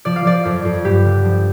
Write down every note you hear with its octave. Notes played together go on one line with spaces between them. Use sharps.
F3 D5
F5
F3 D5
F2
F2
G2 G4
D3
F3